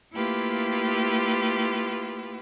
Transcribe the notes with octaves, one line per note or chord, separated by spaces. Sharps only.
A3 A#3 E4 F4 G4 B4